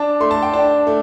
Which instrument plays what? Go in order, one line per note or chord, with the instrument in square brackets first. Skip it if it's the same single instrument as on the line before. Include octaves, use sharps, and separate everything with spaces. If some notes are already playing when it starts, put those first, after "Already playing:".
Already playing: [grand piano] D4 A5
A3 C6
A5
G5
D4 A5
A3